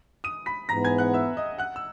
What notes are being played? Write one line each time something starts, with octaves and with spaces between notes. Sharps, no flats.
D#6 D#7
B5 B6
G#2 E3 B3 A#5 A#6
G#5 G#6
F#5 F#6
E5 E6
D#5 D#6
F#5 F#6
E6